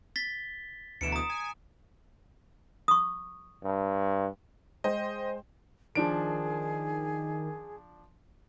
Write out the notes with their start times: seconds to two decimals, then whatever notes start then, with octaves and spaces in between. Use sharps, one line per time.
0.16 A6 B6 G7
1.01 D2 B2 E3 C#7 D7 E7
1.12 A#5 D#6
1.30 G#5
2.88 C#6 D#6
3.64 G2
4.84 G#3 C5 D#5 G5
5.95 D#3 F3 D4 G#4 D7